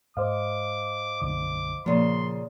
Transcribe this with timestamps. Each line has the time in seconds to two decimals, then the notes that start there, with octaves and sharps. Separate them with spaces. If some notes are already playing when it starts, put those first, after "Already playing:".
0.17 G#2 C5 D#5 F5 D6
1.22 B1 F#2 D3 D6
1.86 A#2 C#3 F3 C6